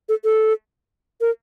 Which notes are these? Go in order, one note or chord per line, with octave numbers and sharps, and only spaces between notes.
A4
A4
A#4